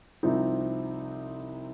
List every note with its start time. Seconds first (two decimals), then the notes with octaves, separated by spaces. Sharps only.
0.23 C2 C3 F3 C4 D#4